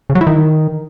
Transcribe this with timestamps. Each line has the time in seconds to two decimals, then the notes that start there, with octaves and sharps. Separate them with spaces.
0.10 C#3
0.15 F#3
0.21 E4
0.27 D#3